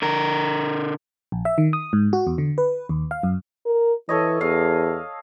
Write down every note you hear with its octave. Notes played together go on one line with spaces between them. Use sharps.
D3 A#4
A#1
E5
D#3
D#6
G#2
F#4
E2
D3
B4
D#2
F5
F#2
A#4
E3 A4 C#5 D#5
E2 F5